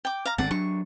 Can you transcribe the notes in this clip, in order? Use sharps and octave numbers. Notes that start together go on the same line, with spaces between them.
G5 D6
F5 A#5
G#1 D3 C4 D5 F#5 A5
F#3 D4 C#6